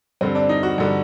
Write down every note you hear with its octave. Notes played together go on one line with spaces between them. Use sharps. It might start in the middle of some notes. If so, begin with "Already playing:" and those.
G2 D3 C4
D4
D#4
F#4
G2 D3